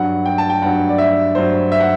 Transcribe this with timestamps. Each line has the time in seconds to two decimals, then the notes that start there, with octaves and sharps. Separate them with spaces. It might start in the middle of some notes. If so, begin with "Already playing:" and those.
Already playing: G2 F#3 F#5
0.26 G5
0.38 A5
0.50 G5
0.62 G2 F#3 F#5
0.89 D5
0.98 E5
1.35 G2 F#3 C5
1.72 E5
1.80 F#5